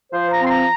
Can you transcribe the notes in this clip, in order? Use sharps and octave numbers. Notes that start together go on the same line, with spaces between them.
F3 C5
A#5
C4 C6
A#5